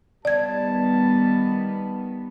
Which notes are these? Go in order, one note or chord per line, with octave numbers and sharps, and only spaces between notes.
D#3 G3 B3 D5 A5 G#6